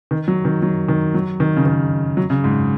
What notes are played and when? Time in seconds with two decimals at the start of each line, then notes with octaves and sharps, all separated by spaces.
0.11 D#3
0.28 F#3
0.45 D#3
0.62 F#3
0.88 D#3
1.14 F#3
1.40 D#3
1.56 C#3
1.66 D#3
2.17 F#3
2.30 C#3
2.44 G#2